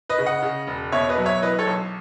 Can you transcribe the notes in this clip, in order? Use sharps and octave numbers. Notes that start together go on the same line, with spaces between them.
B4 D#5
C#3
D#5 F#5
C#3
E1
B2 C#5 E5
B4 D#5
F#3
C#5 E5
E3 B4 D#5
A4 C#5
B1